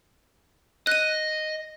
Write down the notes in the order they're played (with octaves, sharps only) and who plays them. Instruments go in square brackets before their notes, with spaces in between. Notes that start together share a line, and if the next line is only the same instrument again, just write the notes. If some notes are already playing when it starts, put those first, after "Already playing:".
[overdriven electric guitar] D#5 [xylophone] F#6 D#7